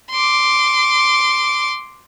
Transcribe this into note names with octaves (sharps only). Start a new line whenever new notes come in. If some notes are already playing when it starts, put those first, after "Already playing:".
C6 D6